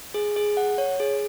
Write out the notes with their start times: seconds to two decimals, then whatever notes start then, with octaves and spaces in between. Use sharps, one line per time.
0.14 G#4
0.36 G#4
0.57 F#5
0.78 C#5
1.00 G#4